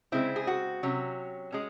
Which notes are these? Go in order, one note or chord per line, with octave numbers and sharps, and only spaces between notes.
C#3 G#3 C4 E4
G#4
F#4
C3 F#3 C#4
G#3 C#4